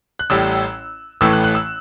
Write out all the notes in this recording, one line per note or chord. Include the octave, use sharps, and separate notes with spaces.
F#6
A1 A2 G3 E6
A1 A2 E3 A3 E6
F#6
F#6
E6